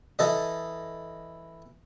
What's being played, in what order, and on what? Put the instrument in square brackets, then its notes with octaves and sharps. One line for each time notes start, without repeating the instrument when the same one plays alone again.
[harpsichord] E3 A4 D#5